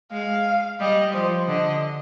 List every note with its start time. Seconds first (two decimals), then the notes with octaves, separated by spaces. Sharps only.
0.11 G#3 F5
0.80 G3 D#5
1.13 F3 C5
1.47 D3 D#5